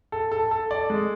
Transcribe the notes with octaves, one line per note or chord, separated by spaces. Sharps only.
A4
A4
A4
D5
G#3